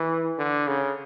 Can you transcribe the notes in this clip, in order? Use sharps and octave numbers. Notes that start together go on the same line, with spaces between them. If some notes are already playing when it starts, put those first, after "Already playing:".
Already playing: E3
D3
C#3